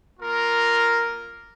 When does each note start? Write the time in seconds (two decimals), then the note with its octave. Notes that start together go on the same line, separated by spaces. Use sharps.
0.20 A#3 F4 A#4